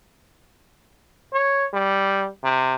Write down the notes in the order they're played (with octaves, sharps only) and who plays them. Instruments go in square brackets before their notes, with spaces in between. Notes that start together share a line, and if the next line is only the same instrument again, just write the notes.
[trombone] C#5
G3
C3